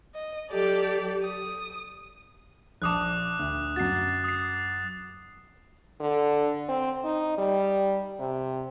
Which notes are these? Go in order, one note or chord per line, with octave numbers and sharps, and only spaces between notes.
D#5
F#3 G4 A4 D5
D#6
A#1 A5 D6 D#6 F#6
D2
F#2 F#4 A6 C7
D#6 C7
D3
C4
D#4
G3
C3